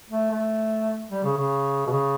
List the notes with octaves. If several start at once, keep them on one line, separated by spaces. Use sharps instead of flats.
A3
A3
G3
C#3
C#3
B2
C#3